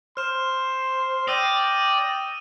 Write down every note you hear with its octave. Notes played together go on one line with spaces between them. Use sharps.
C5 C6 F6 E7
D5 G5 D#6 E6 A#6 D#7